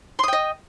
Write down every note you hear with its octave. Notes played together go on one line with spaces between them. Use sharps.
D#5 G5 C6 D#6